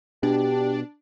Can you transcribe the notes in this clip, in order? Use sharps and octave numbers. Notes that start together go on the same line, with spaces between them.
B2 D4 G4